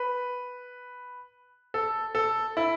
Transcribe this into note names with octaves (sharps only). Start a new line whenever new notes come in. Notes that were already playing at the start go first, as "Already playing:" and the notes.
Already playing: B4
A4
A4
E4